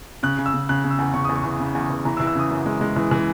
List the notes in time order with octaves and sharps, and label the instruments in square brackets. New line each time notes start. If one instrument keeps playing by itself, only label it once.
[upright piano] C#3 F#6
C#3
E6
C#3
C#3 F#6
C#3
E6
E2
C#3 C#6
E2 D#6
C#6
E3
C#3
E2
E2
E3 A#5
E6
E3
E6
C#3 D#6
F#2
G#3
G#3
E3
E3